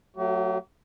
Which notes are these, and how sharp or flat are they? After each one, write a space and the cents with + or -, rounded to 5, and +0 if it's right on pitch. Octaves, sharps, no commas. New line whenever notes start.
F#3 +0 A3 +25 G4 -45